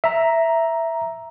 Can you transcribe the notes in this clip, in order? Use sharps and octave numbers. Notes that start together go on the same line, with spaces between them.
E5 A#5